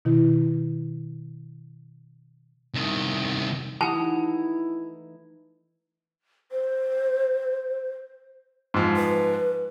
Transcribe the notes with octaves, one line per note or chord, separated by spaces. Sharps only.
B2 D#3 E4
C2 D#3
E3 A3 D#4 E4 G4 F#5 A5 D#6
C5
G#2 F3
B4